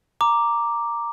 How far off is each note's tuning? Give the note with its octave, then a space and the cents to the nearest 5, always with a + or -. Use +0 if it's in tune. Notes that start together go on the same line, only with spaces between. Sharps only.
A#5 +0 D6 +0